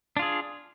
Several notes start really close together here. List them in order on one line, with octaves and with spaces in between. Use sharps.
D4 F4 G#4